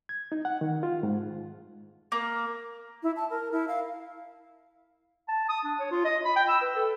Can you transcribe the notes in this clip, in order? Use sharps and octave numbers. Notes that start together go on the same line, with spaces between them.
G#6
D#4
F#5
D#3
F4
G#2
A#3
E4
A5
A#4
E4
F5
A5
D#6
D4
C#5
F4
D#5
B5
G5
E6
B4
A4